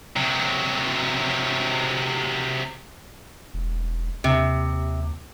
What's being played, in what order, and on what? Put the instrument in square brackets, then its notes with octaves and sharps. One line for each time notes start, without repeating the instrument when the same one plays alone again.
[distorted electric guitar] C3 F#3
[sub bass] E1
[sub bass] D#2 [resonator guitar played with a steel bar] C3